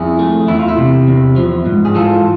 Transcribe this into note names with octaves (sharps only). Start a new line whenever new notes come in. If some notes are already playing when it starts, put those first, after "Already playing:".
Already playing: F2 E4 G#4
A3
E2 E4
F4
E4
C3
E2
F3
G#2
G#4
E3 F4 A4